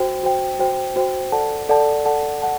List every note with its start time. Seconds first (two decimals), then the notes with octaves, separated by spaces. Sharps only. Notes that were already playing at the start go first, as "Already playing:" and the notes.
Already playing: F#4 C5 G5
0.23 F#4 C5 G5
0.59 F#4 C5 G5
0.96 F#4 C5 G5
1.32 A4 D5 F#5 A5
1.69 A4 D5 F#5 A5
2.05 A4 D5 F#5 A5
2.42 F#5 A5